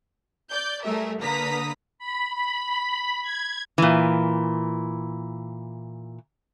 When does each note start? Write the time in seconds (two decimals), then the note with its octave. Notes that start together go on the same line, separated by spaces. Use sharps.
0.51 D5 G6
0.84 G3 A3 G#4 A#4 E5
1.20 D3 A#3 B4 A#5 D#6 B6
1.98 B5
2.33 B5
3.22 G#6
3.78 A#2 E3